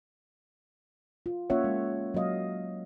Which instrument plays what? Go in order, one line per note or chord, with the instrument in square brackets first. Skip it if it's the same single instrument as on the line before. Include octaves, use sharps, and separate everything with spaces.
[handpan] F4
A#3 C#4 F4 C#5 E5 F#5
G#3
F#3 A#3 D#5 F5